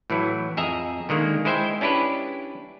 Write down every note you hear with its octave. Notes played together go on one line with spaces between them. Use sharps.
A2 E3 F#3 E4
F2 G#4 D#5 E5 A#5
D3 D#3 G#3 A#3
G#3 E4 C5 E5 G5
C#4 D4 E4 G4 B4